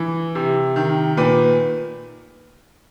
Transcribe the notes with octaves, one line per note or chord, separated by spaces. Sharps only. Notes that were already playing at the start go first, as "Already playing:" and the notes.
Already playing: E3
C3
D#3
A#2 B4